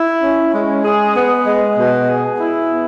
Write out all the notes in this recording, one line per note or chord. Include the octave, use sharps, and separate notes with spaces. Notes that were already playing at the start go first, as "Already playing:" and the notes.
Already playing: E4
C#4
G#3
G#4
B3
G#3
B2
G#4
E4
B3